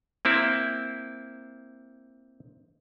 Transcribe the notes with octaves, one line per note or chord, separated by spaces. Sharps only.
A#3 C4 E4